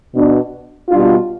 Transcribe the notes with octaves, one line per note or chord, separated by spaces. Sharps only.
B2 B3 D4
B2 G3 D4 F4